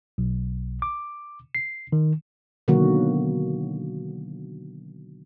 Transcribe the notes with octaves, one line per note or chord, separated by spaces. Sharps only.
B1
D6
C7
D#3
B2 D3 D#3 F#3 A#3 F#4